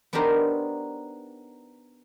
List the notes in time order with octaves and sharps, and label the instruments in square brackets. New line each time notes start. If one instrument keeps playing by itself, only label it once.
[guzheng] B3 D4 D#4 G4 A#4 C5